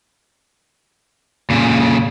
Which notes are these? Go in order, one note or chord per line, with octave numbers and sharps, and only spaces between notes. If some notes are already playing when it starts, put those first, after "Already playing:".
A#2 C#3